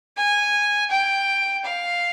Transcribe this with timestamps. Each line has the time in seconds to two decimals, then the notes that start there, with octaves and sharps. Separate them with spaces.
0.17 G#5
0.90 G5
1.64 F5